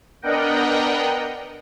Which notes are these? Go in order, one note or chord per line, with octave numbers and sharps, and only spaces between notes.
B3 D4 A#4 D#5 F#5 G5